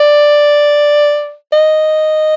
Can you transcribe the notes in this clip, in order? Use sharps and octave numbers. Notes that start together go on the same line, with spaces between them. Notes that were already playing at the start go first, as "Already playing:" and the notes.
Already playing: D5
D#5